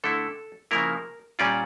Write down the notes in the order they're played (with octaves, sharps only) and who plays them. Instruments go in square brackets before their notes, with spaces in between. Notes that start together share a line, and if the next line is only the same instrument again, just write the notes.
[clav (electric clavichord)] D3 A3 E4 A4
C#3 F3 A#3 E4 A#4
A#2 G3 C#4 F4 D5